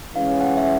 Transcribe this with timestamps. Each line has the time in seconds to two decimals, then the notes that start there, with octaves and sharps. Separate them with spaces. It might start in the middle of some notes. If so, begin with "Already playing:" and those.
0.16 E3 G#3 C#4 F5
0.41 F#5
0.57 E5